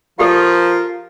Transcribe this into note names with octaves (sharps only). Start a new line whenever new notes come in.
F3 F4 G4 A4 A#4